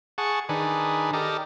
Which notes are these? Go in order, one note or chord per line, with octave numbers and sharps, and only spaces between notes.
G#4 F#5 A5 C#6
D#3 D4 G#4 B4
G4 A4 A#4 D5 D#5